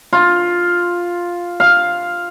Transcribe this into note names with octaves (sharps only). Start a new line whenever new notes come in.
F4
F5